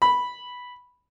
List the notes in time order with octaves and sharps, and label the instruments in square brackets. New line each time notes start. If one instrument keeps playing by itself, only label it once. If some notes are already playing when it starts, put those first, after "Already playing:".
[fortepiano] B5